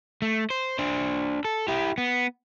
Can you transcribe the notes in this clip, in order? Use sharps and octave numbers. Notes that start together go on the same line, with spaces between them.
A3
C5
D4 C5
A4
E4 G4
B3